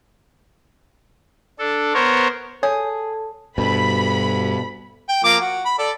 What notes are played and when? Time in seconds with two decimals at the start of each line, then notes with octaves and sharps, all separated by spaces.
1.59 D4 A4
1.94 B3 A#4 C5 C#5
2.63 G#4 A4 C#5
3.58 D2 G2 B2 B5
5.09 G5
5.24 F3 A#3 D6
5.40 F#4
5.65 B5
5.78 A4 D5